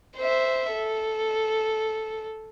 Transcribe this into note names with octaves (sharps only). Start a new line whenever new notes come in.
C5 E5
A4